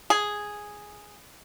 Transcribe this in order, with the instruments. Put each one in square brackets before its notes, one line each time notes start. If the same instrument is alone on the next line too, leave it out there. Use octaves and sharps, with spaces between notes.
[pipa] G#4